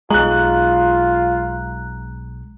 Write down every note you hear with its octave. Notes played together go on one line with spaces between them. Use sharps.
B1 G#3 F4 A#5 F#6